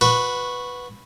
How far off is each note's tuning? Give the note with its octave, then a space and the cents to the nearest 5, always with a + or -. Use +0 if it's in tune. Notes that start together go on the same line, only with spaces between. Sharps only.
F#4 -15 B4 +0